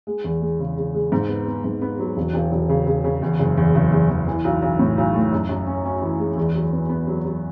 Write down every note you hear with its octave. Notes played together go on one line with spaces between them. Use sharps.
G#3
E2
G#3
C#3
C#3
G#3
G#2
B3
B3
G#2
B3
F#3
E1
E1
E1
C#3
C#3
C#3
E2
F#1
E2
F#1
E2
E2
E3
B1
B1
A2
B1
A3
F#2
F#2
C#4
C#4
E3
G#3
E2
F#3
B3
B3
F#3
F#3